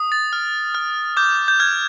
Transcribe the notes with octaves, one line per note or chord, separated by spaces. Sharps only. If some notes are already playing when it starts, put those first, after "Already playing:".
Already playing: D#6
A6
F6
F6
D6 G6
G6
F6 G#6